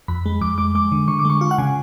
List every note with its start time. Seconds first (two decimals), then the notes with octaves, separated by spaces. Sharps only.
0.08 F2 B5
0.26 G#3
0.41 F2 D6
0.58 G#3 D6
0.75 G#3 D6
0.92 D3
1.08 D3 C#6
1.19 D6
1.25 G#3 C#6
1.41 F4 C#6
1.51 F#5
1.58 C#3 G#5